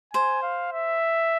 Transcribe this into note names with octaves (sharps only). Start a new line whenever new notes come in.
C5 G#5
F5
E5